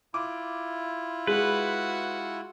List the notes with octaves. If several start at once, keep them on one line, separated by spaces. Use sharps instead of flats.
E4 F4 D6
G#3 F#4 B4